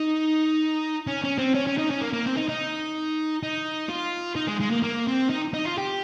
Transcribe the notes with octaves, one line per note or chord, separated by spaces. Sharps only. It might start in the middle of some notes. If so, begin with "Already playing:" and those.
Already playing: D#4
C#4
C#4
C4
C#4
C#4
D#4
C#4
A#3
A#3
C4
D#4
D#4
D#4
F4
D#4
G#3
G#3
A#3
A#3
C4
D#4
D#4
F4
G4